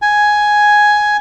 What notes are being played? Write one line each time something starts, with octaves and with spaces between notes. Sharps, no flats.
G#5